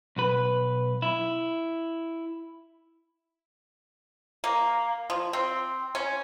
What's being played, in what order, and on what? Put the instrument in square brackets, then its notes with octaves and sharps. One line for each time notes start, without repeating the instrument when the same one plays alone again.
[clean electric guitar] B1 B4
E4
[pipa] A#3
F3
C4
C#4